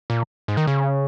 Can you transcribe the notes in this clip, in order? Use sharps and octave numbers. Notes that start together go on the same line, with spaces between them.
A#2
G#2
D#3
C#3